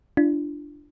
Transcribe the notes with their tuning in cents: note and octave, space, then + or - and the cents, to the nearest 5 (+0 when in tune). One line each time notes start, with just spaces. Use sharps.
D4 +0 F4 -45